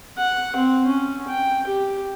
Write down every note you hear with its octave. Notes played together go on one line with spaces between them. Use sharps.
F#5
C4
C#4
G5
G4